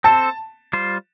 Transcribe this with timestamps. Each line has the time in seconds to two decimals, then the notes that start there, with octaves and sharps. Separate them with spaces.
0.04 C4 A4 C5 A5
0.73 G3 F4 C5